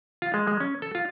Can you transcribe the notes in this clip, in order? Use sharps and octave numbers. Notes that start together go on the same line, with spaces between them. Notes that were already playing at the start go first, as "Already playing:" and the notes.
F4
G#3
G#3
C#4
A4
F4